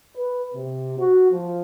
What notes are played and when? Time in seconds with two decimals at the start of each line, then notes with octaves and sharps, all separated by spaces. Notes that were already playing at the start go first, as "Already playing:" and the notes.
0.15 B4
0.53 C3
0.98 F#4
1.31 F3